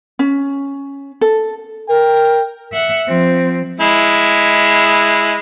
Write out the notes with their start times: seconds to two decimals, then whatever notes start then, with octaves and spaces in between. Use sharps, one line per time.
0.19 C#4
1.21 A4
1.89 A#4 G5
2.73 E5 F#5
3.08 F3 C4
3.81 G#3 E4